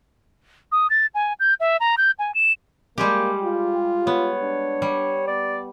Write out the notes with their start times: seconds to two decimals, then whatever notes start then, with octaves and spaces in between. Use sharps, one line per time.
0.72 D#6
0.90 A6
1.14 G#5
1.40 G6
1.60 E5
1.80 A#5
1.98 G6
2.19 G#5
2.34 E7
2.98 G3 G#3 A#3 G4
3.44 F4
4.07 B3 C#5
4.42 D4
4.82 G3
5.28 B3 D5